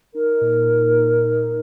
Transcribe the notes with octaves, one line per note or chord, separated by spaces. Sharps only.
D#4 A#4
A#2
A#2
D#4
D#4